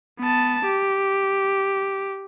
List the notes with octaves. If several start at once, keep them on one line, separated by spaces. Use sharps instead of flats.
B3 A5
G4